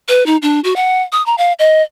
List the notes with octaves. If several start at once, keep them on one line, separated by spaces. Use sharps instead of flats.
B4
D#4
D4
F#4
F#5
D#6
A#5
F5
D#5